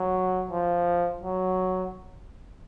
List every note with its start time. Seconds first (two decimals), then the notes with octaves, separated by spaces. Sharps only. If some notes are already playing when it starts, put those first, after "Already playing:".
Already playing: F#3
0.51 F3
1.22 F#3